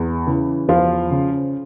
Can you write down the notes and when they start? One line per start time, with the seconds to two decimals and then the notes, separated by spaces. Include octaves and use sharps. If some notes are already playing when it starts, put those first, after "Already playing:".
Already playing: E2
0.27 C#3 E3
0.68 E2 F3 F4
1.11 C#3